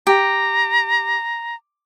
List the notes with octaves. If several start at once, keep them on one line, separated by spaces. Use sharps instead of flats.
G4 A#5